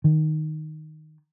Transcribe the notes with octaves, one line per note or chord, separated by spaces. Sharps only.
D#3